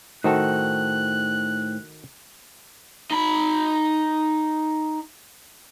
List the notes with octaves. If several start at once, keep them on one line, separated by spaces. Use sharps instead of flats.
A2 D#3 D#4 F#4 A4 C5 G5 F#6
D#4 B5